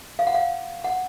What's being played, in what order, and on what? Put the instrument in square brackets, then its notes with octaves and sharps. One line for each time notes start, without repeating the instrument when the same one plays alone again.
[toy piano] F5
F#5
F5
F#5